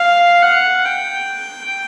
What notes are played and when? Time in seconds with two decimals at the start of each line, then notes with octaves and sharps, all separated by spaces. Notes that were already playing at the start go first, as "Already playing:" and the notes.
Already playing: F5
0.43 F#5
0.85 G5